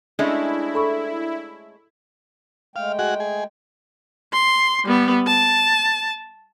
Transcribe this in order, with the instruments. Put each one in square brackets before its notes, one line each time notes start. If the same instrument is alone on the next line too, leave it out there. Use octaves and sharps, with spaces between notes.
[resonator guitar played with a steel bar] G#3 A3 C#4 [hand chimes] D4 D5 E5 [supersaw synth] E4
[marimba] A4 B5 C#6
[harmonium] G#3 A3 G5 [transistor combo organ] F5
[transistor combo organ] F#4 G#4 F#5
G#4
[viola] C6
G3 B3
A5